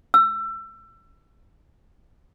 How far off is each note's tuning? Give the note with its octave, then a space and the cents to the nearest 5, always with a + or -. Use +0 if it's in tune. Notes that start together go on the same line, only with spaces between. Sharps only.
E6 +25